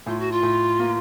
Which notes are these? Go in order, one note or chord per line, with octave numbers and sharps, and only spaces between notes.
A2 F4
F#4
F4
A2
A#3